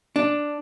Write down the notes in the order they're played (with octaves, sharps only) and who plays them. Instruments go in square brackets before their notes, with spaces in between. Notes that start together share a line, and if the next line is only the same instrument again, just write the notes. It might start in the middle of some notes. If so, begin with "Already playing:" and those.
[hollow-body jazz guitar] D4